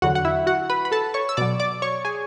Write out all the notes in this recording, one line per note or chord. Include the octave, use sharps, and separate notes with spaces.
E2 D3 F#3 F#4 F#5
F#5
E4 E5
F#4 F#5
B4 B5
B5
A4 A5
C#5 C#6
E6
B2 F#3 D5 D6
D5 D6
C#5 C#6
G#4 G#5